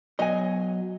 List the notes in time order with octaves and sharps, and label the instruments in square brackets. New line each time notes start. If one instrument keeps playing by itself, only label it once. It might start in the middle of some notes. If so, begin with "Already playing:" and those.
[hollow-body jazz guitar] B2 F#3 [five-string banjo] D#5 G#5